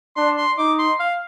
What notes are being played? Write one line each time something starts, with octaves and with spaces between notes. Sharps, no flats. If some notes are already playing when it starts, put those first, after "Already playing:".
D4 C6
C6
D#4 D6
C6
F5